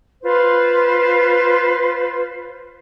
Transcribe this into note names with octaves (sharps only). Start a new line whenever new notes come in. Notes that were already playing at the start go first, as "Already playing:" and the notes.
F4 B4 C5